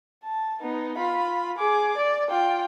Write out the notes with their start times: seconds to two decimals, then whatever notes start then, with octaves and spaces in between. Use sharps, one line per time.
0.24 A5
0.62 B3 D#4
0.98 F4 B5
1.58 G#4 D6
1.97 D5
2.29 F4 G5